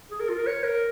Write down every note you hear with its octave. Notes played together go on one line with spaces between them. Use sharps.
G#4
A#4
F4
A#4
C#5
A#4